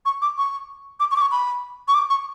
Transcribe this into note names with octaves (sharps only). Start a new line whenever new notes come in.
C#6
D6
C#6
D6
C#6
D6
C#6
B5
C#6
D6
C#6